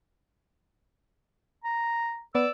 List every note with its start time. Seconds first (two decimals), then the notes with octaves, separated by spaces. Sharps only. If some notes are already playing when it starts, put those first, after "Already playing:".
1.64 A#5
2.35 B3 D5 E6